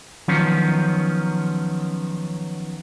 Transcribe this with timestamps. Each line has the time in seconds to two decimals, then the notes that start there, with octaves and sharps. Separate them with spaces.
0.28 D#3 F3 F#3 B3 C#4